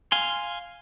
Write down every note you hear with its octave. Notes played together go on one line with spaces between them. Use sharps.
F5 G#5 C6